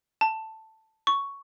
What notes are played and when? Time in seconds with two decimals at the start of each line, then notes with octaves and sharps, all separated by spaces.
0.21 A5
1.07 C#6